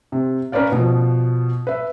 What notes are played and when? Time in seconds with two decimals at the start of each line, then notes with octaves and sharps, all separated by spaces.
0.12 C3
0.52 C#4 A#4 B4 C#5 D5 F5
0.72 B2 F3
1.67 B4 E5